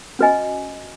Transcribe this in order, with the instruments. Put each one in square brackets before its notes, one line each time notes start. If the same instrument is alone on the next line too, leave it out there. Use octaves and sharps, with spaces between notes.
[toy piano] C#4 F#4 B4 D#5 G#5